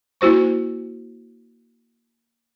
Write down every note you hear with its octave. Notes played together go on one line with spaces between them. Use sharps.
A#3 E4 F#4 C5 C#6